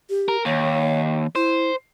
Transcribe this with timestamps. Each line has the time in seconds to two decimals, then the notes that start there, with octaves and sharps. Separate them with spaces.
0.10 G4
0.28 A#4
0.45 D#2 C#5
1.35 E4 C5